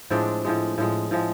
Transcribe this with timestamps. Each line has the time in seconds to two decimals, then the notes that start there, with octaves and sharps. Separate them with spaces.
0.10 A2 F3 G#3 C4 D4
0.45 A2 F3 G#3
0.78 A2 F3 G#3
1.11 A2 F3 G#3